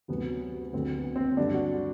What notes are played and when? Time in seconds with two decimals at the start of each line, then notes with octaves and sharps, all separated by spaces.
0.08 D2 C3 F#3 B3
0.73 D2 D3 F#3 C4
0.95 B3
1.16 C4
1.37 G2 D3 F#3 D4
1.53 F#4